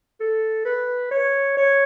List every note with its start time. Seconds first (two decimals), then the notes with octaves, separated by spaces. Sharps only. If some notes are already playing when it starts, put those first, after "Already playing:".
0.20 A4
0.65 B4
1.11 C#5
1.57 C#5